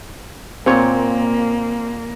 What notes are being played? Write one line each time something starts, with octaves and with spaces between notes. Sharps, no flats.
A#2 A#3 C4 C#5